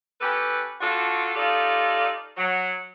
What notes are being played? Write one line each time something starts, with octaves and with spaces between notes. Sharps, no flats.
C#4 G4 A4 B4
C4 D4 F4 F#4 A4
D#4 F4 G4 A4 D5
F#3